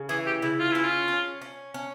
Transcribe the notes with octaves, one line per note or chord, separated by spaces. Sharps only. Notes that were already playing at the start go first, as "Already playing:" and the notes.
Already playing: C#3
E3 G#4
G4
C#3 E4
F4
C#4 E4
F4
C#4
C#4
C#4